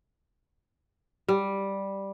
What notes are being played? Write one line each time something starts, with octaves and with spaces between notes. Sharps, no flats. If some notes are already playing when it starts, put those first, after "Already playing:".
G3